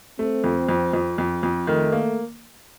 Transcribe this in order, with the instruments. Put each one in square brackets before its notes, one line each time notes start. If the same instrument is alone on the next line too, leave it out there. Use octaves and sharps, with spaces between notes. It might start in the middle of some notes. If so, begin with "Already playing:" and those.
[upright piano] A3 [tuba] C4
[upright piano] F2
F2
F2
F2
F2
[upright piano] D#3 [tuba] A3
[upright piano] A#3